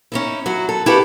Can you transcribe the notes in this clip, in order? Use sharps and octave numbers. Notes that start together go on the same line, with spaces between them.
C#4 D#4 E4
F#3 E4 F#4
A4
E4 F#4 G4 A4 B4 D5